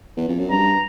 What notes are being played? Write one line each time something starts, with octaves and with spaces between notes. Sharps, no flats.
E2
F2
F#2
G2 A#5